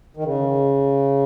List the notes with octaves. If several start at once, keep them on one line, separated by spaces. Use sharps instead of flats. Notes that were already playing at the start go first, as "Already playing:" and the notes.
D#3
C#3